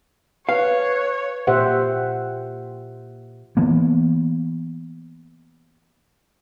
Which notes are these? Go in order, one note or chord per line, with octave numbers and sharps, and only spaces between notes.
B4 C#5 F5
A#2 G4 C5 E5 F#5
E3 A#3 B3